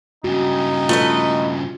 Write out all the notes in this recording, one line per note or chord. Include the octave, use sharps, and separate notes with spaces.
G2 C#3 D#4 F#4
A3 F4 B4 D#5